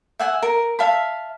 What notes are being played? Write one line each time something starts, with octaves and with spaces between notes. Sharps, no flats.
E5 F#5 G#5
A#4
E5 F5 A5 B5